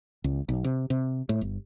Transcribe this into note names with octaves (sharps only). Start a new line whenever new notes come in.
C#2
B1
C3
C3
A2
G1